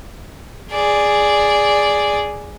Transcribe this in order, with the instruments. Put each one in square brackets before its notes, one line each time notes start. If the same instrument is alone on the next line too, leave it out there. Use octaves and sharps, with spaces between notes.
[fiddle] G#4 D5